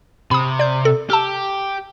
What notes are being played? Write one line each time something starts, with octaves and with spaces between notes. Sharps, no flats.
C3 B5 D#6
D5 G6
A4
G4 A5 E6 F6